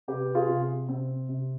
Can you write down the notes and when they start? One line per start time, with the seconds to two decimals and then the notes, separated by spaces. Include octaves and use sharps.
0.08 C3 G4 B4
0.35 F4 G#4
0.48 C3
0.88 C3 C4
1.29 C3